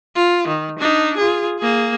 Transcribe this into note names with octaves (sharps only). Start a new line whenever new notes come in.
F4
D#3
D4 D#4
F4 G#4
A#3 G#4